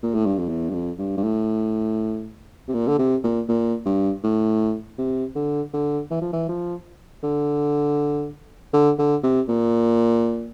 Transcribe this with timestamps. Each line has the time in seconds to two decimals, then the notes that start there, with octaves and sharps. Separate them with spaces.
0.03 A#2
0.14 A2
0.26 G2
0.38 F2
0.49 E2
0.70 G2
0.74 F2
0.99 G2
1.17 G2
1.24 A2
2.68 C3
2.74 A#2
2.88 D3
2.99 C3
3.24 A#2
3.49 A#2
3.86 G2
4.24 A2
4.99 C3
5.36 D3
5.74 D3
6.11 E3
6.22 F3
6.33 E3
6.49 F3
7.24 D3
8.74 D3
8.99 D3
9.23 C3
9.48 A#2